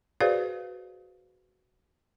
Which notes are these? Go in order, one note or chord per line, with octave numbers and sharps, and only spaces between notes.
F#4 G#4 B4 C5 D5 F5